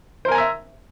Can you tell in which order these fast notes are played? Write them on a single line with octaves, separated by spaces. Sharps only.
C5 A#4 G#5 A#5 E5